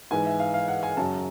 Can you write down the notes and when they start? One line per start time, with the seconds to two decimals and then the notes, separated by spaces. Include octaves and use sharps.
0.11 G#2 E3 G#5
0.26 E5
0.40 F5
0.54 F5
0.68 F#5
0.83 G#5
0.97 F#2 C#3 F#3 A5